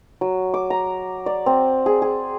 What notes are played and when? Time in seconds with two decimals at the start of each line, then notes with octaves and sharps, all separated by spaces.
0.21 F#3
0.54 D6
0.70 A#5
1.26 D5
1.46 C4
1.86 G#4
2.02 G#4